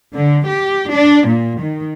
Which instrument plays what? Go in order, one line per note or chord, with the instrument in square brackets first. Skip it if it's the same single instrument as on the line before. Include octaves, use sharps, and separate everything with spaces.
[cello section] D3
G4
D4
A#2
D#3